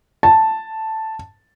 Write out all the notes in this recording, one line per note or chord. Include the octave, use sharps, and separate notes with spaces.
A5